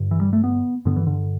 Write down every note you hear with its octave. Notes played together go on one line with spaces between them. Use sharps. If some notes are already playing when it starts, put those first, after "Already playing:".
Already playing: G2 D3
E3
G3
A3
B3
G2 D3 B3
E3
D3